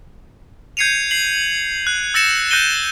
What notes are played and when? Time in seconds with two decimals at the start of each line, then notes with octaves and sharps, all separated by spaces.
0.77 G6 G#6 C7 C#7 D#7 F7
1.11 C7 F#7
1.87 F#6
2.14 E6 A6 A#6 C#7 E7
2.51 F#6 G6 A#6 C#7 D#7 G7